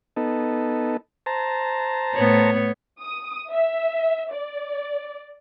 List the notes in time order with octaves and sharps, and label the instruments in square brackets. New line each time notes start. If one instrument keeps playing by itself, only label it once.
[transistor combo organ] B3 D#4 A4
C5 A5 A#5
[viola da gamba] A2 B3 C#5
[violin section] D#6
E5
D5